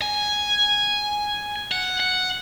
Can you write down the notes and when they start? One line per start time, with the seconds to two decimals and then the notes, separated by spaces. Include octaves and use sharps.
0.02 G#5
1.71 F#5
2.00 F#5